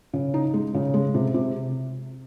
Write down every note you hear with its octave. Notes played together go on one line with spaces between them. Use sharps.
C#3
D#4
G#3
C#3
G#3
C3
C3